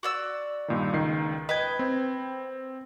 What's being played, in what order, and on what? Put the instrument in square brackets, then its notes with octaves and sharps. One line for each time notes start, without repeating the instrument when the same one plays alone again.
[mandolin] F#4 D5 E6
[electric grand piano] G2 A#2 D#3
C#2 D#3 C7
[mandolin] B4 G5 [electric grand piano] D#5 G#6
[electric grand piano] C4